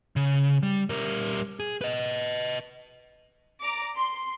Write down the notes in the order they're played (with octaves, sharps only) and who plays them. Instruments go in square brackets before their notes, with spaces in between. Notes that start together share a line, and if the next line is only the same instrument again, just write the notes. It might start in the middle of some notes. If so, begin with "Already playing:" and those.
[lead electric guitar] C#3
G3
G3 A#4
G#4
B4 D#5
[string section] D5 A#5 D6
C6